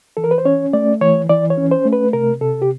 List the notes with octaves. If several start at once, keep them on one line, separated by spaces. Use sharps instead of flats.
E3 A4
A#4
B4
C5
C#4 C#5
A3 D5
E3 C#5
E3 D5
C#5
C#4
C5
A3
B4
C3 A#4
C3 A4
G4